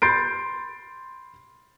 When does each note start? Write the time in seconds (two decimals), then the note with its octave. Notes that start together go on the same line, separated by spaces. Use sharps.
0.02 B5 C6 G6 A6 C7 D7